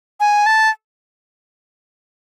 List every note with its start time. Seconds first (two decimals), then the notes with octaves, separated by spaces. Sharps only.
0.20 G#5
0.46 A5